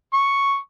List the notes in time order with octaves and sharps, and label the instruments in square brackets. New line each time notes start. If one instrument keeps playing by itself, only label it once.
[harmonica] C#6